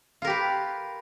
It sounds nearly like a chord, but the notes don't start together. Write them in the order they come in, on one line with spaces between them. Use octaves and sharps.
F4 A#4 G4 B4